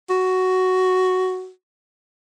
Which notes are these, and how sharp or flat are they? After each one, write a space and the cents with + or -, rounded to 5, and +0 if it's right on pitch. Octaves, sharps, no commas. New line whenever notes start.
F#4 +5